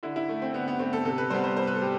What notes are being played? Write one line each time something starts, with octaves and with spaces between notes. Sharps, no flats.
D3 E4
E4
A3
C4
D3 B3
B3
A3 C4
A4
C3 A4
B4
G3 B3 C5
C5
C3 C5
B4
A4
G3 G4